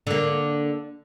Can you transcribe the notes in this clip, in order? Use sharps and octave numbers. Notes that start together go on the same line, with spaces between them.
D3 A#3